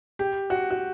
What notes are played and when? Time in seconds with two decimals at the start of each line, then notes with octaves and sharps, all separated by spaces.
0.19 G4
0.50 F#4
0.71 F#4